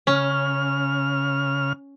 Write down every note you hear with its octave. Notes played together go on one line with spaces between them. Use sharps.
C#3 C#4 F6